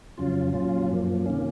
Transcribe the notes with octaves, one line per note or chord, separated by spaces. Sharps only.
F2 C#3 F#3 C#4 F4
A#2 F#3 C#4 F4
F#2 F3 A#3
C3 D#3 A#3 C#4